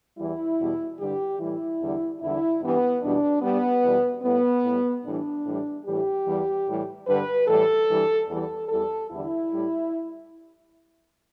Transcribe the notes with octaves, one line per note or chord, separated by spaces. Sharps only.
E2 E3 G3 E4
E2 B2 G3
G2 D3 G3 G4
A2 E3 G3 E4
E2 D3 G3
E2 D3 G3 E4
G2 E3 G3 B3
E2 B2 G3 D4
G2 G3 B3
E2 B2 G3
A2 G3 B3
A2 G3
A2 E3 G3 D4
A2 E3 G3
A2 E3 G3 G4
E2 E3 G3
A2 E3 G3
G2 D3 G3 B4
A2 E3 G3 A4
G2 E3 G3
E2 E3 G3 A4
E2 E3 G3 A4
E2 D3 G3 E4
A2 G3